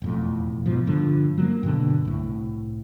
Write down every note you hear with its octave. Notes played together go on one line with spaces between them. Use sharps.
E1 F2 A2
G#2 B2 F3
G2 D3 F3
F#3 G3 A#3
G2 B2 D3 D4
C2 A2